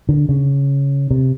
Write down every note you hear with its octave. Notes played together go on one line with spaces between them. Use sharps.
D3
C#3
C3